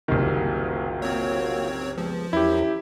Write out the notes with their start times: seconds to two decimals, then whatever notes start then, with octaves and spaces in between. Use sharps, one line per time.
0.08 F#1 C2 D#3 A#3 F4 F#4
1.02 C4 C#5
1.98 F3 G#3 B3
2.33 E2 C#4 E4 G4 A#4